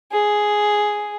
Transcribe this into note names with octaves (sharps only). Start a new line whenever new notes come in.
G#4